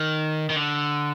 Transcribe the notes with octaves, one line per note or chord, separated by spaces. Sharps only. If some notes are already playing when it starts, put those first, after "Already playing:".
Already playing: D#3
D#3
D3